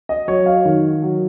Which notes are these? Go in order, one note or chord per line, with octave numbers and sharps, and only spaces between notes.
D#5
F#3 C#5
F5
D#3
F#3